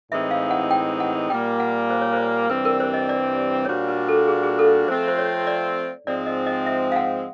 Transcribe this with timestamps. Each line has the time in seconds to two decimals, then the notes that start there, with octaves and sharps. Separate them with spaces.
0.12 A2 E3 G#3 C4 D#4 E5
0.31 F5
0.51 F#5
0.71 G5
1.00 F#5
1.30 A#2 G3 A#3 G5
1.60 F#5
1.90 C5
2.01 C#5
2.13 C5
2.50 G2 E3 G3 C4 B4
2.65 A#4
2.80 C5
2.94 D#5
3.09 D5
3.65 C#5
3.68 A#2 G3 A#3 D4 F#4 C5
3.88 B4
4.08 A4
4.28 G#4
4.43 G#4
4.59 A4
4.88 F3 A3 C4 F4 C5
5.08 C5
5.18 C#5
5.47 D5
6.07 G#2 F3 G#3 C4 D5
6.26 D#5
6.46 D#5
6.66 E5
6.92 F5
6.96 F#5